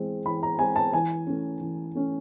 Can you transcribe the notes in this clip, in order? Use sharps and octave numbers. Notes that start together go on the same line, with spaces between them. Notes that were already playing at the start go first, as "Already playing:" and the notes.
Already playing: E3 G#3 C4
E3 B5
A#5
G#3 C4 G#5
A5
E3 G#5
A3 C#4
E3
A3 C#4